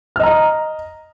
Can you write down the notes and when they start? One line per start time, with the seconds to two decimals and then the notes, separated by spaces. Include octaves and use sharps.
0.16 F6
0.20 D#5
0.24 A#5